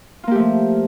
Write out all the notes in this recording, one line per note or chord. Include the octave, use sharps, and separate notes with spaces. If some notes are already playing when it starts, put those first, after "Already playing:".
F3 A3 A#3 F4 G4